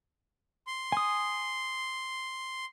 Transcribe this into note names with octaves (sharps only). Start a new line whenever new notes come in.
C6
G#5 D#6